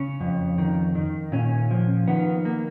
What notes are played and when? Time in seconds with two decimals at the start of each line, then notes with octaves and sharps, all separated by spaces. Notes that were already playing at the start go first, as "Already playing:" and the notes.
Already playing: C#3 C#4
0.20 F2
0.58 D#3
0.95 D#3
1.32 A#2 C#4
1.71 F3
2.08 D#3 B3
2.45 A#3